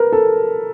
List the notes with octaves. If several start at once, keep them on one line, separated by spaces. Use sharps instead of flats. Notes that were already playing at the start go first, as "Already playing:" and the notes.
Already playing: A#4 B4
A4